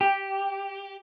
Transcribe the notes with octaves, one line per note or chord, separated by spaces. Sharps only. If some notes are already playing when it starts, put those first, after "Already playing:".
G4